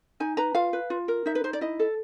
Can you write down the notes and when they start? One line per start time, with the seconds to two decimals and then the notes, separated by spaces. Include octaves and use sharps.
0.20 D#4 G#5
0.37 B4 A#5
0.55 F4 F5
0.73 B4
0.90 F4
1.08 A#4
1.26 D#4 E5
1.35 B4
1.44 D#4 C5
1.53 D5
1.61 E4 D#5
1.80 A4